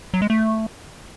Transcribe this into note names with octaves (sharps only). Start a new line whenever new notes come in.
F#3
G#3
A3